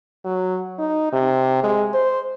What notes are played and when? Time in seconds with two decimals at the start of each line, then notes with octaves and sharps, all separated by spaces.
0.24 F#3
0.79 D#4
1.12 C3
1.64 G#3
1.94 C5